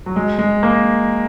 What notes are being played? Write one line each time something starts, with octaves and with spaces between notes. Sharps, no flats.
F#3
G#3
G#3
A#3